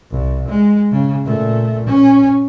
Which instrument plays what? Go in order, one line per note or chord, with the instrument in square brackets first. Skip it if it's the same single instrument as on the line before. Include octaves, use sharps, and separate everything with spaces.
[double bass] C2
G#3
C#3
A#2 A3
C#4